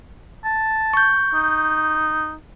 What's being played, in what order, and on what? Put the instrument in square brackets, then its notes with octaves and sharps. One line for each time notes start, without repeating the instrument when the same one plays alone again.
[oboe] A5
[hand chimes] C#6 G6
[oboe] D#4